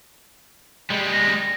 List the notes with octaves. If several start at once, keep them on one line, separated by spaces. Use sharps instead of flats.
G3 G#3
A#6